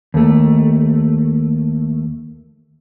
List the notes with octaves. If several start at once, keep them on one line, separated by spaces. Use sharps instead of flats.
D#2 A3